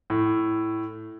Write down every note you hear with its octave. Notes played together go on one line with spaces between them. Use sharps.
A2